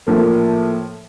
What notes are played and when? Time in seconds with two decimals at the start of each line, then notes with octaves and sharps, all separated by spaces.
0.07 A2 F3 A#3